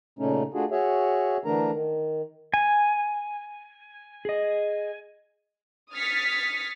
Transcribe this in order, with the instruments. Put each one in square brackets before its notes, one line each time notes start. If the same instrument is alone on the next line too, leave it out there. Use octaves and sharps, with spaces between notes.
[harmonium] A#2 C#3 A3 C#4 D#4
A3 D4 F4 F#4 G#4
F#4 G#4 C#5 E5
D3 E3 A3 D4 A#4 A#5
D#3
[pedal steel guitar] G#5
[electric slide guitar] G#4 D#5
[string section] D#6 F6 G#6 A6 B6 C#7